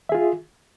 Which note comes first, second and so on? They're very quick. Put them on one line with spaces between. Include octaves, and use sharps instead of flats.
E5 G#4 F4